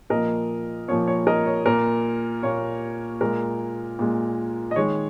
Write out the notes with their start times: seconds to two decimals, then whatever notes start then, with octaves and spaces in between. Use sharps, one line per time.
0.10 A#2 F3 A#3 A#4 D#5
0.88 A#2 F3 A#3 C#5
1.07 C#5
1.27 A#4 D#5
1.46 C#5
1.65 A#2 A#3 A#4
2.43 A#2 A#3 C#5
3.21 A#2 G#3 A#4
3.99 A#2 G#3
4.71 D#5
4.76 D#3 G#3 C#5